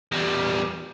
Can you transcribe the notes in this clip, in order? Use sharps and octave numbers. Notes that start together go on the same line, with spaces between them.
E2 G3